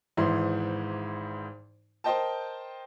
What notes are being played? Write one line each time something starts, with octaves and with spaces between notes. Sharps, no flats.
G#1 G#2 E3 E4 C6
A#4 C5 D#5 G5 A5